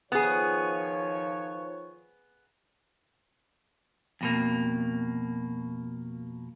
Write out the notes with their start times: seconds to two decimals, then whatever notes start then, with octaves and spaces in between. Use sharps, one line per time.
0.12 D#3 F3 B3 G#4 C#5
4.21 F2 B2 A#3